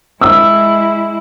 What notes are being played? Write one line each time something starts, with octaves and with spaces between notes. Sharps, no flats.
G#3 E4 E6